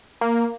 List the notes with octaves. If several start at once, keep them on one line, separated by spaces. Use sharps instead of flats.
A#3